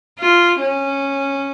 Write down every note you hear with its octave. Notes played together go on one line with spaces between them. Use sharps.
F4
C#4